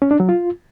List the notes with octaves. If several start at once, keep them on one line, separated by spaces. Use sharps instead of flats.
C#4
D4
F#3
F4